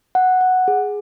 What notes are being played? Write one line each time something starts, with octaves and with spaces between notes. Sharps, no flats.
F#5
F#5
G#4